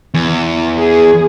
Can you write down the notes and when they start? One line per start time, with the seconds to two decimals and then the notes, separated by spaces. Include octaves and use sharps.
0.14 E2
0.77 G#4